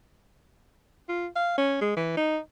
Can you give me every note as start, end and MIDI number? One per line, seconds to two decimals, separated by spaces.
1.09 1.27 65
1.36 1.56 77
1.58 1.76 61
1.81 1.93 56
1.97 2.16 52
2.17 2.38 63